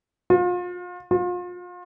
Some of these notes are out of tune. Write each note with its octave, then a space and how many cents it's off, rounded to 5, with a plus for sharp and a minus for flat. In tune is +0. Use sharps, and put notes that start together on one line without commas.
F4 +35
F4 +35